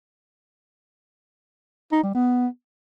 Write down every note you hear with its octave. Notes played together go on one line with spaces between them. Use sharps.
D#4
G3
B3